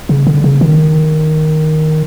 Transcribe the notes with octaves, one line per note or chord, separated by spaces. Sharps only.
C#3
D3
C#3
D#3